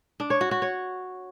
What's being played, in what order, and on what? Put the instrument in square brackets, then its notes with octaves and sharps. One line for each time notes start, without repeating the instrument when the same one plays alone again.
[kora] D4
C#5
F#4
F#4
C#5